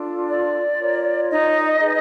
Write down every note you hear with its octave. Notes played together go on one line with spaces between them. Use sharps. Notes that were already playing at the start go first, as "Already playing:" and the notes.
Already playing: D4 F4 A4
D5
F4 A#4 C#5
D#4 D#5
D#4 G#4 B4